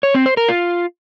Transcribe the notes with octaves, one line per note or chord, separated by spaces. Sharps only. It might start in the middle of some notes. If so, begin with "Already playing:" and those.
C#5
C4
C5
A#4
F4